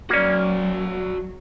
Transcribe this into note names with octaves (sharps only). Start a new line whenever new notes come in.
F#3 A#3 C#4 F#4 D5